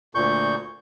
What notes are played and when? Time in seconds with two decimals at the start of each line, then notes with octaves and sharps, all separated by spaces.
0.15 D2 A#2 C#6 G6